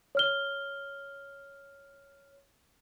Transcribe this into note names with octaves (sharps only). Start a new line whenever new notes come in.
C#5 F6 G7